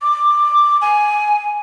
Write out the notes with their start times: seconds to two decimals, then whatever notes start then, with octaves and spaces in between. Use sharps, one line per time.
0.02 D6
0.81 G#5